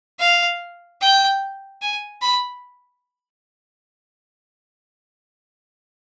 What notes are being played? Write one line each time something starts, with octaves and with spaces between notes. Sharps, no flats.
F5
G5
G#5
B5